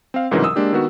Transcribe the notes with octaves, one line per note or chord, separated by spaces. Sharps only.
C4 F5
C2 G#2 C#3 E3 F#3 A#4
D#6 E6
G#3 A#3 D4 G4
D#3 B3 F#4